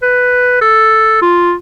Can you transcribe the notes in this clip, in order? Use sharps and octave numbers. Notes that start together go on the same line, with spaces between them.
B4
A4
F4